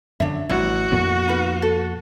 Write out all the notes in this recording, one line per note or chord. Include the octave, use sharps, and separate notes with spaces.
F#2 D3 F#3 D4 E5
A1 A2 G3 E4 F#4
F2 A#2 B3
D#4 F4 B4
A4